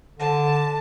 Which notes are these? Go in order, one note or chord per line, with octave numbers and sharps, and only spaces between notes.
D3 A5